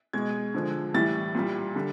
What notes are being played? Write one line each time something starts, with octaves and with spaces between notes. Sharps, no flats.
B2 G#3 G#6
D3 F3 G#3
A2 E3 G3 A6
A#2 G3
D3 G3